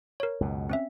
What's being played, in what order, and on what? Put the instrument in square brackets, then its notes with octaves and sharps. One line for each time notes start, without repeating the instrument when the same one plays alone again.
[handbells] A#4 C#5
[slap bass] C#2 F#2 B2
[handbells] C4 C#4 E5